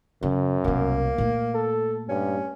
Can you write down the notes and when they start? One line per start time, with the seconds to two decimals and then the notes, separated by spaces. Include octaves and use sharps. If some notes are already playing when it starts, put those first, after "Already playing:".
0.23 F#2 C#3
0.64 C2 B2 A#3
1.18 A#2 A3
1.55 A4
2.09 G2 C#4